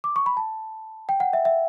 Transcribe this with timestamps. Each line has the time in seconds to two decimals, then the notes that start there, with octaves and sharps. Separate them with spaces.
0.04 D6
0.16 C#6
0.26 B5
0.37 A5
1.09 G5
1.20 F#5
1.33 E5
1.45 E5